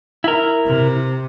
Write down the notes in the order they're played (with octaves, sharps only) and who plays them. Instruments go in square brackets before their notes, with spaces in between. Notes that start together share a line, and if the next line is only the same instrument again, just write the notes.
[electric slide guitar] E4 A#4
[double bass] C3